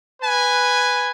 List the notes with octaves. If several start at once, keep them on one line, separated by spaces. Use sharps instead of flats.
B4 G#5